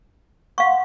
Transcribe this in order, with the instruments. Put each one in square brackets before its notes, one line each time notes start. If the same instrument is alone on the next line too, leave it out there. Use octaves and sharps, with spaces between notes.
[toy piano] F5 C#6 [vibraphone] F#5 C6